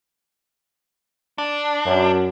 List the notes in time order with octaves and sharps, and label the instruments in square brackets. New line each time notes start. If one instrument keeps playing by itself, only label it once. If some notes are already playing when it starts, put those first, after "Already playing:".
[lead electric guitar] D4
[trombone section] F#2